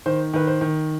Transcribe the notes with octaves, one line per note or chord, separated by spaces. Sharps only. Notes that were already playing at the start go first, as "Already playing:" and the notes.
D#3 C5
D#3 B4
C5
D#3